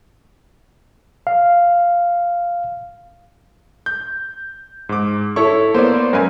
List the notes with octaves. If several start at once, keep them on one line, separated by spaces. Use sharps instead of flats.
F5
G6
G#2 D6
E4 A4 C#5 C#6
A#3 B3 C5 D5
F#2 A#4 B4 G#5